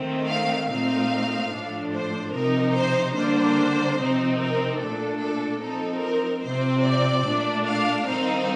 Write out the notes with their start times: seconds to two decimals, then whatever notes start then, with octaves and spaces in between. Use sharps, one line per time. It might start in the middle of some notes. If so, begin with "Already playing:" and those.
Already playing: D#3 A3 C4
0.29 F5
0.69 A#2 A3 C4 D#4 F5
1.52 A2 F3 A3 D4
1.93 C5
2.34 C3 F3 C4 D#4 A#4
2.74 C5
3.15 D3 G3 A#3 D4 C5
3.97 C3 F3 C4 D#4
4.38 A#4
4.79 A#2 A3 D4 A4
5.20 A4
5.61 F3 C4 D#4 A4
6.02 A#4
6.43 C3 F3 C4 C5
6.84 D5
7.24 A#2 A3 D4
7.66 F5
8.07 D#3 G3 C4 D#4 F5